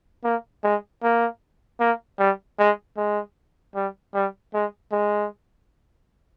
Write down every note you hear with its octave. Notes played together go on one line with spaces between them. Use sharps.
A#3
G#3
A#3
A#3
G3
G#3
G#3
G3
G3
G#3
G#3